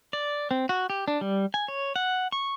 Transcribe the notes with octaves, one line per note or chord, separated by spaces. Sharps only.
D5
C4
F#4
G4
D4
G3
G#5
C#5
F#5
C#6